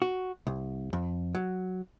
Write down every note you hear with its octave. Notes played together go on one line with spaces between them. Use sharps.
F#4
C2
F2
F#3